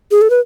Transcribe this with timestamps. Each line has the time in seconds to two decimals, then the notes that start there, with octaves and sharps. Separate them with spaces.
0.11 G#4
0.22 A4
0.30 B4